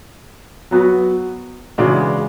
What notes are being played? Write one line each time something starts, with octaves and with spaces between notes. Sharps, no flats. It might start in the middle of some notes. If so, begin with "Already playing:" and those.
F#3 B3 F#4
C#3 E3 G#3 D4 F#4